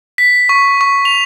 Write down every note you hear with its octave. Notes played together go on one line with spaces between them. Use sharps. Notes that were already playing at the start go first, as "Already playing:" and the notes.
B6
C#6
C#6
F7